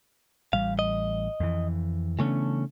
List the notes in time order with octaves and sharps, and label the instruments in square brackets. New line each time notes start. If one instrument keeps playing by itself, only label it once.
[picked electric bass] A1 G3 [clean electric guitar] F5
[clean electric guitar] D#5
[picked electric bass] F2 E3
[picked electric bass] C#3 B3 D4 [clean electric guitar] E3 A3 C#4